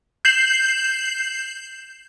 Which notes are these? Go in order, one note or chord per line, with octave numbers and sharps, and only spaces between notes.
G6 C7 E7 F#7